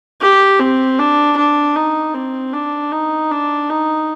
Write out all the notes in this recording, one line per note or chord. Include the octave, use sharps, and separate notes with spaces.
G4
C4
D4
D4
D#4
C4
D4
D#4
D4
D#4